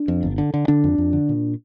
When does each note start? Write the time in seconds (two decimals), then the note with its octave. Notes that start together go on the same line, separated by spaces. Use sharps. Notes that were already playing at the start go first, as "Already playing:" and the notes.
Already playing: D4
0.08 F2
0.23 G1
0.38 D3
0.54 D3
0.68 D3 D4
0.84 F2
0.98 F2
1.13 D3
1.29 A#2